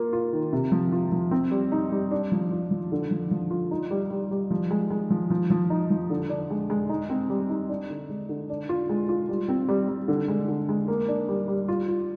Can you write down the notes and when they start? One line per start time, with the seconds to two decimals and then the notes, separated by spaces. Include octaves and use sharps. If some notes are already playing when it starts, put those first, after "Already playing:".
Already playing: A#3 F4
0.13 F4
0.33 D#3
0.53 C3
0.72 F3
0.92 F4
1.12 F3
1.31 C4
1.51 G3
1.72 D#4
1.92 G3
2.11 D4
2.32 F3
2.51 F4
2.71 F3
2.92 D3
3.11 F3
3.31 F3
3.51 F4
3.71 D#4
3.91 G3
4.11 G3
4.31 G3
4.51 F3
4.71 G#3
4.90 G#3
5.10 F3
5.30 F3
5.50 F3
5.70 D#4
5.91 F3
6.10 D3
6.29 D4
6.50 G#3
6.70 G#3
6.89 D#4
7.10 C4
7.30 G3
7.49 D#4
7.69 D4
7.90 D3
8.09 G#3
8.29 D3
8.50 D4
8.69 F4
8.89 G#3
9.09 F4
9.29 G3
9.49 C4
9.69 G3
9.89 G3
10.08 D3
10.28 G#3
10.48 D3
10.69 G#3
10.88 A#3
11.08 D4
11.29 G3
11.48 G3
11.68 F4
11.88 F4